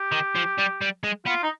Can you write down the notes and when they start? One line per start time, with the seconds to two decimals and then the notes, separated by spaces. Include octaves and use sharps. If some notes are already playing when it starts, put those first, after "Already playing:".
Already playing: G4
0.12 D#3
0.35 F3
0.58 G3
0.81 G3
1.04 G#3
1.26 B3 F4
1.43 D#4